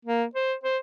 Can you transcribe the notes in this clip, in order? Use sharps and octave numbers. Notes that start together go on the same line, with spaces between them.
A#3
C5
C5